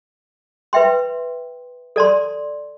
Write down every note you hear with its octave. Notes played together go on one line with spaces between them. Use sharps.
B4 E5 G5 C6
A4 D5 A5 C6